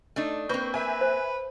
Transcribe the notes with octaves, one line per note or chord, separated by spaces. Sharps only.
A3 D4 D#4
A#3 C4 B4 C#6 G6
B4 E5 G#5
C5